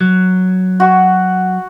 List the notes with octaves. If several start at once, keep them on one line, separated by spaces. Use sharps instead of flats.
F#3
F#4